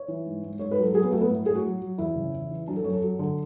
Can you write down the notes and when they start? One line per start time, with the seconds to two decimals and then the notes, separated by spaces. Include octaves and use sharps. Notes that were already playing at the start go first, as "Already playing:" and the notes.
Already playing: C#5
0.08 E3
0.26 G#2
0.43 G#2
0.59 G#2 C#5
0.71 B4
0.78 F#3
0.83 A4
0.94 F#3 G#4
1.04 B3
1.12 F#3 A3
1.21 B3
1.30 A2
1.46 A2 G#4
1.55 F#4
1.63 F#3
1.81 F#3
1.98 E2 E4
2.16 C#3
2.33 E2
2.50 E3
2.67 F#3 D4
2.76 A4
2.84 F#2 C#5
2.93 A4
3.02 F#3
3.19 D3